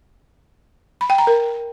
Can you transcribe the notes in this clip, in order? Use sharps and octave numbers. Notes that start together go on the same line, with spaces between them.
B5
G5
A#5
A#4